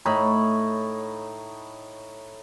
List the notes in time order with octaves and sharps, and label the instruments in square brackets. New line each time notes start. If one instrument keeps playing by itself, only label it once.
[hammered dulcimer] A2 D#4 B5 C#6